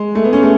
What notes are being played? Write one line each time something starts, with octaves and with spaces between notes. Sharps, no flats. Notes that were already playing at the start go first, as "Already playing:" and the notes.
Already playing: G#3
A3
B3
C#4
A3